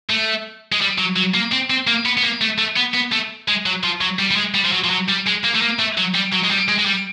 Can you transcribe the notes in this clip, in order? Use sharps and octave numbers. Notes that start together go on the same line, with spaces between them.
A3
G#3
G3
F#3
F#3
A#3
C4
C4
A#3
B3
B3
A#3
A3
A3
B3
B3
A3
G#3
F#3
F3
F#3
G3
G3
G#3
G3
F3
F#3
F3
F#3
G3
G#3
A#3
A3
A#3
A3
F#3
G3
F#3
G#3
G3
G#3
G#3
G3